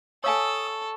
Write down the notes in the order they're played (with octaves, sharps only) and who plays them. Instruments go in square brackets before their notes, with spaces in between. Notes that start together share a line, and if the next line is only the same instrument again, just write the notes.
[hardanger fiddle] A4 [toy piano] C#5 F5 G#5 [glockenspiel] A5 C#6 [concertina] D#6 E6